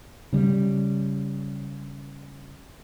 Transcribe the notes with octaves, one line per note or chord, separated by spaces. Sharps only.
C#3 G3